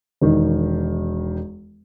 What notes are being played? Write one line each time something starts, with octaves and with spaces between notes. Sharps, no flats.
E1 D#3